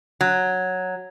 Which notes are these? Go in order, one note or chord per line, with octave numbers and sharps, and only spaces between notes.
F#3